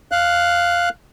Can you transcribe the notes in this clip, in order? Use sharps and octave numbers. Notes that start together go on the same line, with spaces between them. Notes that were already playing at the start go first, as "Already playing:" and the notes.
F5 F#6